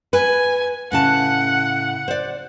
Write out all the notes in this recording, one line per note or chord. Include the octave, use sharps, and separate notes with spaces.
B4 G#5
A2 C#3 F#5 A5
C5 D5